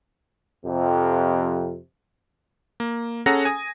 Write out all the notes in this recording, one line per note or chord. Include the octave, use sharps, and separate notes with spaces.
F2 C3
A#3
C#4 G#4 A4 F#5 A#5 A#6
G#5 D#6